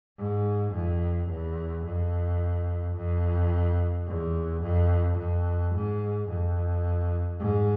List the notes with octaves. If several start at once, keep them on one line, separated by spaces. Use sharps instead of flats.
G#2
F2
E2
F2
F2
E2
F2
F2
G#2
F2
G#2